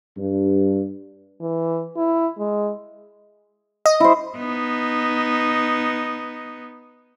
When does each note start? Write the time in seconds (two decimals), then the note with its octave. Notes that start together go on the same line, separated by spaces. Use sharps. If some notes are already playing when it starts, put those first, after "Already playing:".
0.17 G2
1.41 E3
1.97 E4
2.38 G#3
3.86 D#5
4.00 E4 C5
4.37 B3 D#4